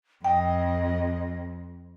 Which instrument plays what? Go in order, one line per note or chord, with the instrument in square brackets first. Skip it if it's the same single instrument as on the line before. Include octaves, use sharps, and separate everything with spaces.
[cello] F2 [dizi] D#5 [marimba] G5